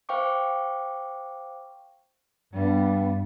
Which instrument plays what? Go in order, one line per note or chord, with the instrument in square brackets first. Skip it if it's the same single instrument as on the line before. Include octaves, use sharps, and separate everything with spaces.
[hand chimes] C5 F5 G5 C#6 D6
[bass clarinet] G2 [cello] G3 B3